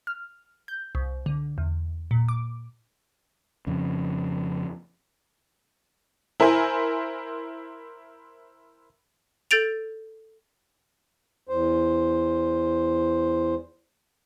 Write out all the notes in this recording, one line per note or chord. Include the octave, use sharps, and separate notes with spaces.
F6
G6
C2
D3
E2
A#2
D6
F2 C#3
E4 A#4 C5 E5 G#5
A4 G6 A6 D7 F7
E2 C5